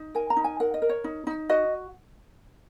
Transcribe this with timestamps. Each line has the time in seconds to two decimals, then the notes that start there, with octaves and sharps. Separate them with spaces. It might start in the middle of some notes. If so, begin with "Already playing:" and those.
Already playing: D#4
0.15 A#4 G#5
0.30 A#5
0.37 D#4
0.44 G#5
0.60 A#4 F#5
0.74 D#5
0.82 A#4
0.89 C#5
1.04 D#4
1.27 D#4
1.49 F#4 D#5